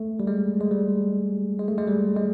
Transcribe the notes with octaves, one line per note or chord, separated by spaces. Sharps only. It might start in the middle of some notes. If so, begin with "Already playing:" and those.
Already playing: A3
G3
G#3
G#3
G3
G#3
A3
G#3
G3
G#3